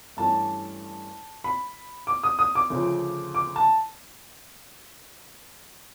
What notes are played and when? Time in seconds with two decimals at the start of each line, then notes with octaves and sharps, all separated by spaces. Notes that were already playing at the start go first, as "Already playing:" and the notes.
0.17 G2 E3 A3 C#4 A5
1.44 B5
2.07 D6
2.23 D#6
2.39 D#6
2.55 D6
2.70 D2 C#3 F3
3.35 D6
3.56 A5